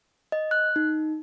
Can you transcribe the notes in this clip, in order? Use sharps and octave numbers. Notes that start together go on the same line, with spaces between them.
D#5
F#6
D#4